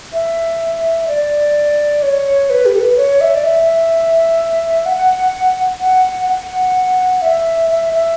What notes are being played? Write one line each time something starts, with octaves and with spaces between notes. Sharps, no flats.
E5
D5
C#5
B4
G4
A4
B4
C#5
E5
D5
E5
F#5
F#5
F#5
E5
E5
E5